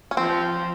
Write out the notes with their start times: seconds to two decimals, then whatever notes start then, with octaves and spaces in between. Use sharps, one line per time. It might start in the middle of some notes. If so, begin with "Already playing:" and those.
0.11 C#4
0.17 F3 C4